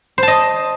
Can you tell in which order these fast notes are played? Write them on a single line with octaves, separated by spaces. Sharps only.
C5 A5 D#5